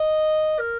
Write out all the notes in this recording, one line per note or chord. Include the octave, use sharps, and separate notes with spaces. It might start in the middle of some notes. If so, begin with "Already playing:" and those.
Already playing: D#5
A#4